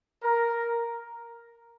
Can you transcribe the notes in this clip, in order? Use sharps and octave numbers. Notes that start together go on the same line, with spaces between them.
A#4